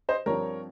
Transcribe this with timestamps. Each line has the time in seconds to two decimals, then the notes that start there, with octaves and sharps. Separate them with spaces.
0.09 C5 D#5
0.26 G2 F3 C4 A#4 C#5